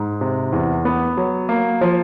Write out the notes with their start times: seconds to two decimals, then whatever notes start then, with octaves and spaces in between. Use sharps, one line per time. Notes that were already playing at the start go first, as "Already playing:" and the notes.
Already playing: G#2
0.21 C3
0.52 E2
0.85 B3
1.17 F#3
1.49 A#3
1.81 F3